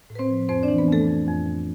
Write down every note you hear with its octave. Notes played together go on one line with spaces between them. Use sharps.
A2
B4
C4 C5
F3
F2 C4 C5
D4 D5
E3
B3 B4
F2 A3 A4
F2
F2
F2